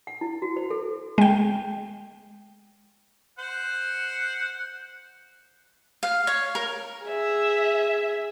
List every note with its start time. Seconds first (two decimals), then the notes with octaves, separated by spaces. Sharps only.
0.07 F#5
0.21 E4
0.42 F#4
0.57 C5
0.71 A4
1.18 G#3 G5
3.39 C5 F#5
6.03 F5
6.27 C#5
6.55 A#4
7.04 G#4 E5